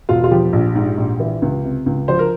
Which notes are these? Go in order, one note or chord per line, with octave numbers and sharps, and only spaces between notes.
E1 F4
F4
F3 G4
A#1
G#2
A#1
E3
C#2
C3
C#2
F3 C5
A#4